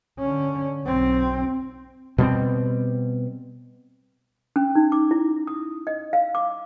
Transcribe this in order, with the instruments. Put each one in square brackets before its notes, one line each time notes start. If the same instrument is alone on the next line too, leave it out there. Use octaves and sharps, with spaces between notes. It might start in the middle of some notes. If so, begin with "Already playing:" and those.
[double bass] D3 C#4
B1 C4
[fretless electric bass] B2 G3 G#3 C4
[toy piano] C#4
D#4
D6
E4
D#6
D#5
F5
D6